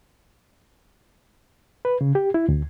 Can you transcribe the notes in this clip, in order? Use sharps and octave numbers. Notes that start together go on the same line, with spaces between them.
B4
C#3
G4
E4
D2